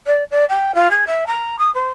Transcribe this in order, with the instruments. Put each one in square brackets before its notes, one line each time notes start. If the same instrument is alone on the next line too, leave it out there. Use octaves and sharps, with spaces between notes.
[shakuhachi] D5
D5
G5
F4
G#4
E5
A#5
D#6
C5